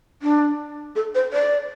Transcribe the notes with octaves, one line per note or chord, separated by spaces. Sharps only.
D4
A4
C5
D5